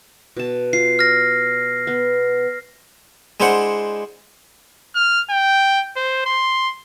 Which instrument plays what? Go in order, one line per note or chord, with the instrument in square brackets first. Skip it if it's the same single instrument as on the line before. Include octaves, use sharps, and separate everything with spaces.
[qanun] B2 A5
[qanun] F4 [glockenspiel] C7
[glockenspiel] F6 A#6
[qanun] B3
[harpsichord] G#3 D4 E4 C5 F#5
[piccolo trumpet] F6
G5
C5
C6